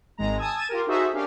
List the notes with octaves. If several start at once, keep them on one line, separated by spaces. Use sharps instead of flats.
G#1 G#3 A#5
G#5 A5 D#6 E6 G#6
G#6 A6 D#7 E7
F4 G4 A#4
D#4 F#4 G#4 A4 C5 E5
C#4 D4 G4 A#4 F5